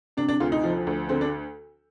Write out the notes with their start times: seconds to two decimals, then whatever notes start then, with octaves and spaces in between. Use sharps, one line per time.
0.17 C3 D4
0.28 D4
0.40 D2 F4
0.52 D#4
0.63 F3
0.87 D2
1.09 D3 C4
1.21 D4